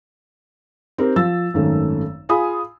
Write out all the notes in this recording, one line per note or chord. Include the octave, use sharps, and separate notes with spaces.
C4 D#4 G4 A#4
F3 E6 A6
G#1 F#2 D#3 A3
F4 G#4 G#5 B5 D#6